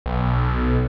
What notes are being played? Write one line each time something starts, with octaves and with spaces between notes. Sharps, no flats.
B1